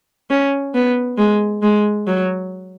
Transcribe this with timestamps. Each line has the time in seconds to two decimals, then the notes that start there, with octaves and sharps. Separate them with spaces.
0.30 C#4
0.74 B3
1.18 G#3
1.63 G#3
2.07 F#3